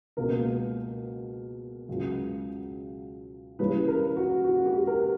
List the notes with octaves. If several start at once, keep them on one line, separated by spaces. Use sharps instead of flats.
C#2 B2 A#3 A#4
C#2 C#3 F#3
C#3 E3 G3 C#4 B4
A#4
F#4
F#4
G4
A#4